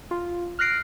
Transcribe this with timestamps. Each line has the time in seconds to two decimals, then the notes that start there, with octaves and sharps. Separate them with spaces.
0.11 F4
0.59 F6 F#6 A#6 C7 D7